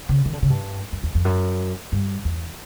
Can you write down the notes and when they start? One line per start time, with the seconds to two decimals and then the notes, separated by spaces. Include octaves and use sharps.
0.09 C#3
0.25 D#3
0.33 D3
0.42 C#3
0.50 G2
0.92 F#2
1.03 E2
1.15 F2
1.25 F#2
1.92 G2
2.25 E2